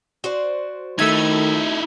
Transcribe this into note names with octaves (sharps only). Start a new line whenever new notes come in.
F#4 C5 D5
D#3 A3 D#4 E4 E5 G#6